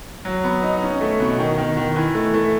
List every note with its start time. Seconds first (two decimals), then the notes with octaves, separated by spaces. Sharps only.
0.25 F#3
0.44 B3
0.63 D#4
0.82 C#4
1.01 A3
1.20 B2
1.39 D#3
1.58 D#3
1.77 D#3
1.96 E3
2.15 A3
2.34 A3